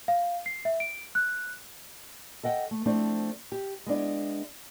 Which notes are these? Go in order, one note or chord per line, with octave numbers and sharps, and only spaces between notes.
F5
C7
E5
D7
F#6
A4 D#5 F#5 G5
A3
F3 A3 C4 D4 E4
G4
G#3 B3 D4 E4